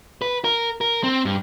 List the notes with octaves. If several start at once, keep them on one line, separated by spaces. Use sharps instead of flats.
B4
A#4
A#4
C4
G2